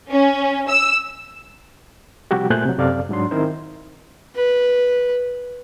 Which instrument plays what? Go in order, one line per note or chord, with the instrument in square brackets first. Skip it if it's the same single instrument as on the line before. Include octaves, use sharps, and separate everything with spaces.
[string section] C#4
E6
[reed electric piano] C3 F3 G3 F#4 G4
A#2 A3 C5 G#5 F#6 G6
C3 F#3
F#2 C3 A4 D5 F5
G#2 F#3 D4 C6
D#3 C4 D#4 E4 A#4 C5
[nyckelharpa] B4